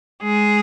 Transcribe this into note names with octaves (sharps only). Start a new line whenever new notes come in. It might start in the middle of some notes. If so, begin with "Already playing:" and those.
G#3 G#4